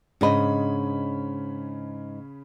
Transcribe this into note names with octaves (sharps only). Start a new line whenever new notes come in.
G#2 C#3 C#4 D4 D#5 B5